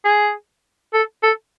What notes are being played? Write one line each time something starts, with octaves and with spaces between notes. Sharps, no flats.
G#4
A4
A4